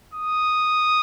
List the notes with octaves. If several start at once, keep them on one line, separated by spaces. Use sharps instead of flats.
D#6